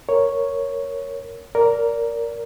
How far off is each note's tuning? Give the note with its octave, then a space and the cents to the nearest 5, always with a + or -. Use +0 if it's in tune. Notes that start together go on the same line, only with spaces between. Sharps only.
A#4 +0 C#5 +0
A#4 +0 D5 -25